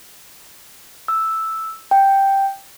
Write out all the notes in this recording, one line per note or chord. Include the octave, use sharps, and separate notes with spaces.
E6
G5